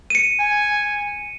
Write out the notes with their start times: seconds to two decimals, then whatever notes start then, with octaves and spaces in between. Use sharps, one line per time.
0.10 C#7 D#7
0.39 G#5